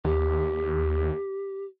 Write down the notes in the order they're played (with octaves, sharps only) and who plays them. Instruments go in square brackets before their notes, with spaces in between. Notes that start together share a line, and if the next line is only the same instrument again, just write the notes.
[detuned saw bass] D#2 [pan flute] G4